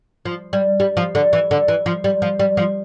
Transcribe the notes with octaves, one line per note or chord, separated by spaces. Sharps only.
F3
G3
G3
F3
D3
E3
D3
E3
F3
G3
F3
G3
F3